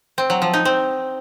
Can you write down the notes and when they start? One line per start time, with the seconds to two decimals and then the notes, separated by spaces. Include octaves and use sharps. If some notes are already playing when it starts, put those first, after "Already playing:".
0.18 C4
0.30 F#3
0.42 F3
0.54 D#4
0.65 C4